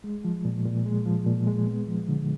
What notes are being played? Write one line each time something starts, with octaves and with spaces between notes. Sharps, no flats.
G#3
F3
A#2
A#2
G#3
F3
A#2
G#3
B3
F3
D3